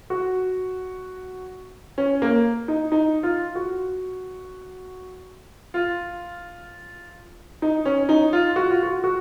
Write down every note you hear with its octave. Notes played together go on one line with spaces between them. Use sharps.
F#4
C#4
A#3
D#4
D#4
F4
F#4
F4
D#4
C#4
D#4
F4
F#4
F4
F#4
F#4